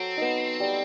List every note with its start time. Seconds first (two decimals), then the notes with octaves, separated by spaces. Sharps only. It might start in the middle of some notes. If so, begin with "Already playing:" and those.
Already playing: F#3 C4 A4
0.17 B3 D#4
0.60 G3